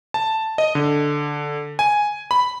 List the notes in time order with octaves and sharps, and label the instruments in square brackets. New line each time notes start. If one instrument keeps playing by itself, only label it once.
[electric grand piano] A5
D#5
D3
G#5
B5